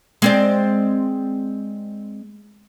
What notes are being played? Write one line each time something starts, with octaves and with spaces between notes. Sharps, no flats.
G#3 C4 D5